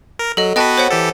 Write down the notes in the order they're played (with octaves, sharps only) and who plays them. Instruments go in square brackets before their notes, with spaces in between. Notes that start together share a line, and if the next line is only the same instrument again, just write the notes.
[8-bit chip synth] A#4
[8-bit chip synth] F#3 [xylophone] A4 D#5
[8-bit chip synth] B3 F#4 B4 [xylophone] D#5 G5 A5
[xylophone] C5 C#5 F#5
[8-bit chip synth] E3 G4 A4